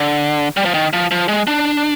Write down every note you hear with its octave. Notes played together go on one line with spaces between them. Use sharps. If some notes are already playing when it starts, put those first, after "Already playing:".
Already playing: D3
G3
F3
D#3
F3
F3
G#3
D4